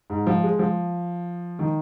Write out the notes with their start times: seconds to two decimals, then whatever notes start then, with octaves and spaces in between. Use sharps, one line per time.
0.10 G#2
0.27 F3
0.43 G#3
0.59 F3
1.59 D#3